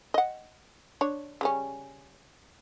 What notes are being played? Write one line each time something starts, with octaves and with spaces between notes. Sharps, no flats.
D#5 F#5
D4 C#5
C#3 G3 C#4